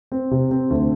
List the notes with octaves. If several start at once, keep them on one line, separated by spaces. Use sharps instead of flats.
C4
C3
C4
D2